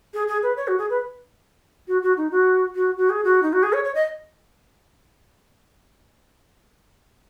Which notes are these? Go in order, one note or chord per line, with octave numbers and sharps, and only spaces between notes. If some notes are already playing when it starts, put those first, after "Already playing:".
G#4
G#4
B4
C#5
F#4
G#4
B4
F#4
F#4
D#4
F#4
F#4
F#4
G#4
F#4
D#4
F#4
G#4
C#5
C#5
D#5